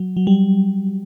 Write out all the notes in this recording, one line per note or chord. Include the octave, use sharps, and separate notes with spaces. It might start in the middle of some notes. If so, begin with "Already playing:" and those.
Already playing: F#3
F#3
G3